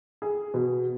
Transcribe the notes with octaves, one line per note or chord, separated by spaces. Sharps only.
G#4
B2